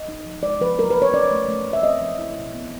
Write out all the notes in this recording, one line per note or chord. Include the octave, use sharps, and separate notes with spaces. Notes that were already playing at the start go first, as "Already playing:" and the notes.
Already playing: D#5
D#4
F3
G#3 D5
F3 B4
F#3 A#4
B4
F#3
C#5
C#4 D5
A3
A3
A3
E5
C4 D#5
F3
E4
B2
B3